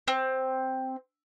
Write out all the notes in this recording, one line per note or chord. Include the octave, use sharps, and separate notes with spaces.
C4